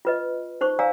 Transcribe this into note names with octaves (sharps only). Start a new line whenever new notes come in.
F4 B4 D#5
D#4 C5 C#6
D5 F5 G#5 A#5 E6